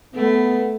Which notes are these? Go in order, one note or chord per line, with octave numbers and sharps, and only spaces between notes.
A3 B3